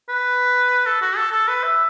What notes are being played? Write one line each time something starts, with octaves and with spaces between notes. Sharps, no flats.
B4
A4
F#4
A4
A4
B4
E5